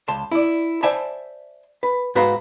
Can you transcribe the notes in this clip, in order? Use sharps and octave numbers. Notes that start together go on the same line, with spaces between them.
C#2 A5 C6
E4 D5
C5 D5 E5 G#5 A5 B5
B4
G#2 F#4 B4 F5 A#5 C6